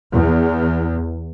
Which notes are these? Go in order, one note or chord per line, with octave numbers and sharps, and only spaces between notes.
E2